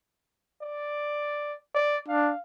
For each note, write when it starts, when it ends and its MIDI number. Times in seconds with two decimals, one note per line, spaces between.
0.62 1.57 74
1.75 1.98 74
2.08 2.32 62
2.08 2.41 77